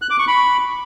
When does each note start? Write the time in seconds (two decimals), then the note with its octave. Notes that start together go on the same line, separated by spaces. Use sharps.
0.02 F#6
0.10 D6
0.19 C#6
0.27 B5